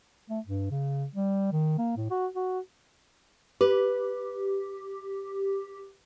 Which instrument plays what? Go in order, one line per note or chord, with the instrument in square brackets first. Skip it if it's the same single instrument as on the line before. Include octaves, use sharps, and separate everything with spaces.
[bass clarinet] A3
G2
C#3
G3
D#3
A#3
A2
F#4
F#4
[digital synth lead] G4 [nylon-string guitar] B4